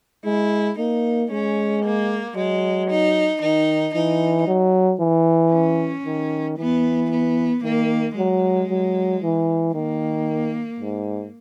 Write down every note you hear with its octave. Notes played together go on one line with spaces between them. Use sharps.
G#3 E4
A#3 D#4
G#3 C#4
A#3
F#3 G#3
D#4
D#3 D#4
E3 D#4
F#3
E3
C#4
D#3
E3 B3
B3
D#3 A#3
F#3 G#3
F#3
E3
D#3 A#3
G#2